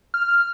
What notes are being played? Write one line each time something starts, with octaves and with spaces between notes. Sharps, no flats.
F6